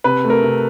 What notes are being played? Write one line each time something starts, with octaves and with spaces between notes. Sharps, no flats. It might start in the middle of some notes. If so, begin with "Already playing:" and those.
C3 B4
A3
A#4
C3